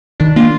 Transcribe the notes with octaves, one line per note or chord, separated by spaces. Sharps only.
D#3 D4
A#3 D4 F4